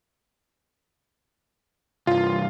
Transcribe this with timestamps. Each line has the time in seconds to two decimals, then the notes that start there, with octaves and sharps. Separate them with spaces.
2.07 C2 G2 F4